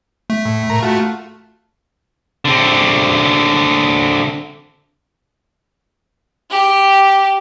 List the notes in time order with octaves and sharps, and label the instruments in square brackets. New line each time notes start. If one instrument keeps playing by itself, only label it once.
[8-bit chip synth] A3
[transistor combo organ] A2
A2 A#4 A#5
F4 F#4 A4
[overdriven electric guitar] D3 C4
[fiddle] G4